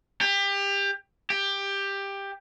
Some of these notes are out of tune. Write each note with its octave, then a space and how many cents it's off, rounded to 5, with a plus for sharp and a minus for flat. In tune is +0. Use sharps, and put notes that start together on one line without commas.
G4 +25
G4 +15